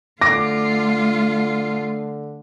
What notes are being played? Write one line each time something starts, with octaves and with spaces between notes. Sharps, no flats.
D3 A3 F4 D6 A#6